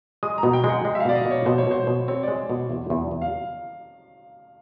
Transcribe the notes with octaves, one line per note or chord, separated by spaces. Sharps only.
G#3 D#6
A#5
B2
G5
G#3
F#5
G#3
E5
F5
B2 D5
D#5
B2
C#5
B2 C5
C#5
B2 C5
B2
C4 C#5
G#3 D5
B2
E2
E2
E2
F5